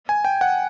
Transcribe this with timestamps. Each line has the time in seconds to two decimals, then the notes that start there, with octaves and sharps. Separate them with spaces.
0.09 G#5
0.25 G5
0.41 F#5